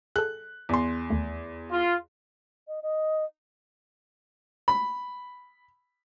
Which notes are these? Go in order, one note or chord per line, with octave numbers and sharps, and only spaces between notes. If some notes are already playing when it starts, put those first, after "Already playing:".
G#4 A4 F#6
E2 C6
D#2 A3
F4
D#5
D#5
B5